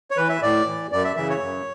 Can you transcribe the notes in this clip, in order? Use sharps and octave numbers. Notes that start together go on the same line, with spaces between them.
C#5
E3 B4
E5
A2 D5
E3
F#2 D5
E5
C#3 E3 E5
C#5
F#2